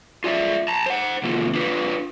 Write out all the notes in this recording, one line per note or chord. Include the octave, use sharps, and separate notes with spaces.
F4 D5 E5
A5 A#5
C5 F#5
C3 D#3 A#3 F4
D4 F4 B4